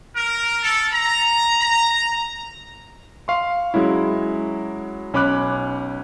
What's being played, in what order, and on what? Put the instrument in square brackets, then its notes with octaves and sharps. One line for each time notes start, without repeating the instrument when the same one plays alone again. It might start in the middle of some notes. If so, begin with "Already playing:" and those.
[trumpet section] A#4
A4
A#5
A#5
[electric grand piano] F5 C6 C#6
F#3 G#3 C#4 E4
B1 C#4 B5 D6 F#6